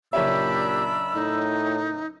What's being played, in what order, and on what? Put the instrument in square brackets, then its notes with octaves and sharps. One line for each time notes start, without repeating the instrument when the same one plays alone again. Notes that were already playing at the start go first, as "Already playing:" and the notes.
[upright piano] F#1 C#5 E5 [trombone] A#2 [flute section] D4 B5 E6 [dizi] G4
[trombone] A2 [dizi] D#4